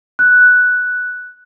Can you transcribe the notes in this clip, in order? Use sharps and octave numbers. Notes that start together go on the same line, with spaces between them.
F#6